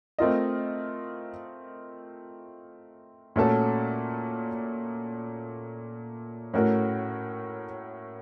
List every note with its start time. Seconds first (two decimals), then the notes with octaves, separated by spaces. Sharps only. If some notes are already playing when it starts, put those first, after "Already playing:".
0.19 A3 C4 F4 A#4 D#5
3.36 A#2 A3 C#4 F#4 A4
6.54 A2 A3 C#4 F#4 A#4